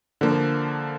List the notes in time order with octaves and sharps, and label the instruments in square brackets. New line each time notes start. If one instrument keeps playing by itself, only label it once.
[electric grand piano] D3 F3 A#3